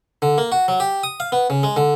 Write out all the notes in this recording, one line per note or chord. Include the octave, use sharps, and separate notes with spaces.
D3
A#3
F#4
F#3
G4
D#6
F5
B3
C#3
G#3
D3